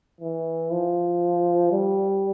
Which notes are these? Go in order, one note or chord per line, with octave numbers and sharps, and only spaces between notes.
E3
F3
G3